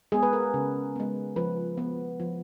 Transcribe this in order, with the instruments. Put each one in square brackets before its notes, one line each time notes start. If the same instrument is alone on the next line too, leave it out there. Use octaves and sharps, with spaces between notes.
[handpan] G#3 B3 G#4
B4
A#4
C#3
G#3 B3
F3 B4
B3
F3